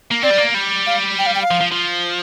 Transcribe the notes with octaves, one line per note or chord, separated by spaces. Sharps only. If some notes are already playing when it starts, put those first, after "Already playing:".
A#3
C4 D5
G3
A#3
G3
F5
G5
F5
G5
F5
F3
F3
F3